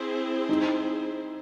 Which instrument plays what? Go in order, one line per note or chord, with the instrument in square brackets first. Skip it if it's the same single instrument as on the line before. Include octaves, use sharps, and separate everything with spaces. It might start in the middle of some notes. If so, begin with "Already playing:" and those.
Already playing: [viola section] C4 E4 G#4 C5
[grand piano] D#4